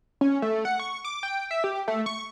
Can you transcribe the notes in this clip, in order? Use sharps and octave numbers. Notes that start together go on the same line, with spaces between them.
C#4
A3
F#5
C#6
D6
G5
E5
G4
A3
C#6